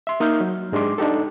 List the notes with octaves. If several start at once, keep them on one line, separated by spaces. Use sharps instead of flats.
E5 C6
A#3 D#4 D#5 E5 F6 G6
F#3
G#2 G#3 D4 G4 C6 D6
D4 D#4 G4 A4